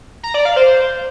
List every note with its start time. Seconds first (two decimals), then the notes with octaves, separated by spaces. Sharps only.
0.23 A#5
0.34 D5
0.45 F5
0.56 C5